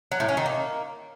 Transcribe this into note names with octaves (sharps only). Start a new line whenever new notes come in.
F#3
A2
C#4
D#3
A#3